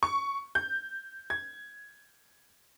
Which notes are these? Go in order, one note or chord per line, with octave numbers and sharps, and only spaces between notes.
C#6
G6
G#6